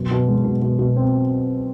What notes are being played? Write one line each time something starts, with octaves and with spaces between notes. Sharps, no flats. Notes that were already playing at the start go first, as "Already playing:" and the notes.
Already playing: F#2 B2
B2
G#3
B2
B2
B2
C4